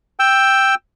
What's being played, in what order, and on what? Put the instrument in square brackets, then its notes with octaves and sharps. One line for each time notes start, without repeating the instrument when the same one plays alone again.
[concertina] G5 E6